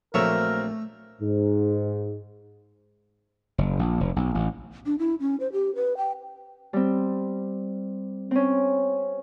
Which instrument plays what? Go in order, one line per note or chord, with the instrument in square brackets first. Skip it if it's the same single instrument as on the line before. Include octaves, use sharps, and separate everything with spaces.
[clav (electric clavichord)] A#1 C#5 E5 [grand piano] F#3 A#3 C4 [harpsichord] A3 [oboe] A#4
[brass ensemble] G#2
[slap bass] F#1
A#1
F1
B1
A1
[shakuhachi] D4
E4
C#4
C5
G4
B4
G5
[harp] G3 C4
C4 C#4